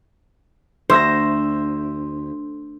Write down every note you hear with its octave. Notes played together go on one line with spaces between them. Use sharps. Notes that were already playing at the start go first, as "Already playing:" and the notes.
D2 C5 E6 A#6